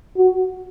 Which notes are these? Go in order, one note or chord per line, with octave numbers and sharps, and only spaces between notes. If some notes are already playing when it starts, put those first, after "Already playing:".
F#4